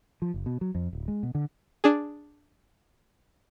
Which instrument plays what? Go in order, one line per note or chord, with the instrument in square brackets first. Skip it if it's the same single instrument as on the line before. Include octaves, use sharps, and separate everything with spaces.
[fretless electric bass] F3
F#1
B2
F#3
F2
D1
G#3
B2
D3
[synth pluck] D4 G#4